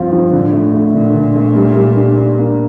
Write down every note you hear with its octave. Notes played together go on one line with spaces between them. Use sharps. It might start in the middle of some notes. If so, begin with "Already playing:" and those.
Already playing: G2 F3 C4 F4
F3
A2 D3
A3
A3
A#2 D3
D3
A3
G3
G3
D4
D4
A#3